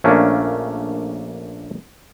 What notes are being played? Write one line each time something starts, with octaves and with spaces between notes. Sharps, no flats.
A#1 A3 A#3 C#4 D4